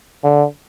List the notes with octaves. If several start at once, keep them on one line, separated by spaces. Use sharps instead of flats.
D3